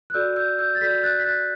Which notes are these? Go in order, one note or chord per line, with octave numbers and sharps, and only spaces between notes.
F#6
F#4 A4 D5 E6 G6
E6 G6
E6 G6
A6
F#4 A4 D5 G6 B6
F#6 A6
B6
F#6 A6